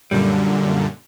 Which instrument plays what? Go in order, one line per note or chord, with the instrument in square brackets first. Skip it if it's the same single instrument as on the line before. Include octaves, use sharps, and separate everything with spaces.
[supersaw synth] F#2 A#2 D3 [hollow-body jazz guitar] G3